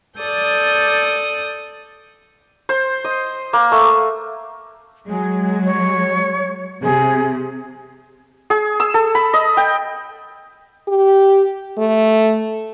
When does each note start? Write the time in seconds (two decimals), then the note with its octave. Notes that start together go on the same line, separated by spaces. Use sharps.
0.20 A4 D5 D#6 G6
2.69 C5
3.05 D#5
3.53 A#3
3.72 A3
5.06 F#3 G#3 G#4
5.64 C#5
6.82 C3 G#4
8.50 G#4
8.80 E6
8.94 A4
9.15 B5
9.33 D#5
9.57 G5
10.88 G4
11.78 A3